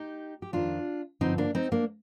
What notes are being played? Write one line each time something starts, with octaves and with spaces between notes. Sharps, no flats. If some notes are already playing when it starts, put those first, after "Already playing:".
Already playing: D#4 G4
G4
F2 D#3 D4 F4
G2 D3 F3 C4 D#4
A#3 D4
C4 D#4
A#3 D4